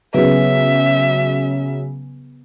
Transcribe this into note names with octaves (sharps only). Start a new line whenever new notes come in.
C#3 F#3 B3 G#4 B4 E5